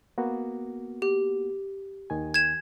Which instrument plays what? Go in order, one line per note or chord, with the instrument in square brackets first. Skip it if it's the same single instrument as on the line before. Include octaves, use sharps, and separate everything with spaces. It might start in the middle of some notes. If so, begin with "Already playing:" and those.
[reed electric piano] A#3 B3 F#4
[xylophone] G4
[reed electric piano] D#2 D#3 G#5
[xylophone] G#6 E7